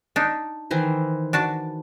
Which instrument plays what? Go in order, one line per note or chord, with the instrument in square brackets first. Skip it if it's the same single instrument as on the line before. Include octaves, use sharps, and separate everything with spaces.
[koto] D4 D#4
[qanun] D#3 E3 C5
[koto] D4 F#4 A5